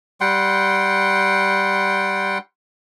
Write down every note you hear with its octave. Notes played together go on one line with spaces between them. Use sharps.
G3 F#5 G5 C6